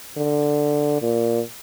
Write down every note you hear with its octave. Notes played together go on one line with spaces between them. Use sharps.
D3
A#2